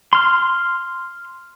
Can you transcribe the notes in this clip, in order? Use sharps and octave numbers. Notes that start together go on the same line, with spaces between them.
C6 F6